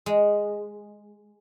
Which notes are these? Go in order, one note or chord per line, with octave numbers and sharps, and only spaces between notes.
G#3